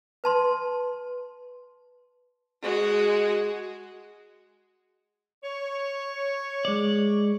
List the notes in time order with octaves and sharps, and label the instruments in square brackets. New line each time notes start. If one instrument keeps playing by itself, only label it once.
[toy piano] B4 A5 C6
[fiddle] G#3 F#4
[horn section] C#5
[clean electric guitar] G#3 D5